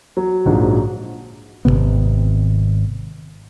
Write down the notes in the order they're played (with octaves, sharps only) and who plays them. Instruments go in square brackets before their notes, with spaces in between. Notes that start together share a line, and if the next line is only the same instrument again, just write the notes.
[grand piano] F#3
A#1 G#2 F3 F#3
[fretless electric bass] G#1 F#2 C3 B3